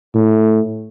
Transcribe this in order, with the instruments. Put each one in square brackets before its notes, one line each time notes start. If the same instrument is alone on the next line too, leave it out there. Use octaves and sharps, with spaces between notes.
[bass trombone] A2